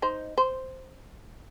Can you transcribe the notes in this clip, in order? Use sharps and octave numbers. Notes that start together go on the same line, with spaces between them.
D#4 C5
C5